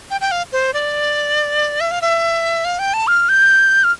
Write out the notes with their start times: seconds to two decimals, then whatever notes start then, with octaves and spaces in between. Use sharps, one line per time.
0.11 G5
0.21 G5
0.31 F5
0.52 C5
0.74 D5
1.80 E5
1.91 F5
2.02 E5
2.65 F5
2.79 G5
2.94 A5
3.07 F6
3.29 G6
3.84 F6